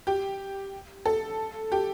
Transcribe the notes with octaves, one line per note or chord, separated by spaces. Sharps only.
G4
A4
G4